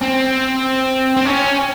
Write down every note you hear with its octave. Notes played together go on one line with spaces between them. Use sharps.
C4
C4
C#4